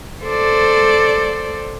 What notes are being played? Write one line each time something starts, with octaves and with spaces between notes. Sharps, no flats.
A4 C5 D5